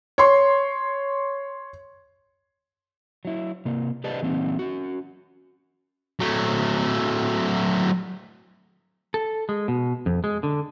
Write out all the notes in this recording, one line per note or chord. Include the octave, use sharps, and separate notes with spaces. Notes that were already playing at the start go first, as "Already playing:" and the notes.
C#5 C6
F#3 E4
C3 A#3
G4 B4 C5 D5 D#5 A5
E3 A#3 C4 D#4
C#4 F#4
F#3 A3
A4
G#3
B2
F2
G#3
D3